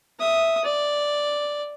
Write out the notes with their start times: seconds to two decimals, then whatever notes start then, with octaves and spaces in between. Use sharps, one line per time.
0.20 E5 D#6
0.64 D5